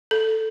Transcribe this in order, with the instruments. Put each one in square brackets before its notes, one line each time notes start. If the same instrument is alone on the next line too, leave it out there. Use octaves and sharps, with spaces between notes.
[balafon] A4